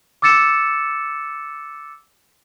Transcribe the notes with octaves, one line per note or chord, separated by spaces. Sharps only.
D6 E6 A6 C#7 E7